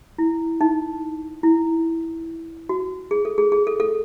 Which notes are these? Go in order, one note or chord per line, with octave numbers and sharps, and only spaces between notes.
E4
D#4
E4
F#4
G#4
A4
G#4
G#4
A4
A4